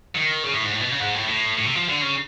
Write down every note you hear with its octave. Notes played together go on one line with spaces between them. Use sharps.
D#3
C#3
A2
G#2
A2
B2
C#3
G#2
A2
A2
A2
C3
F3
D3
C#3